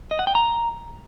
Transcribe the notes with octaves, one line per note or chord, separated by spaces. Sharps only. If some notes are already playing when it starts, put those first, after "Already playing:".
D#5
F#5
G5
A#5